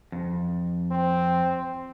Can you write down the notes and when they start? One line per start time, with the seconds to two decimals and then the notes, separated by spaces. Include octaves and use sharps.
0.12 F2
0.91 C4